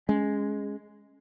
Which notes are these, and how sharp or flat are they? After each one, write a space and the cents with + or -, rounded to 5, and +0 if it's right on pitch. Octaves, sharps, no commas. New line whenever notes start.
G#3 +0 C#4 +5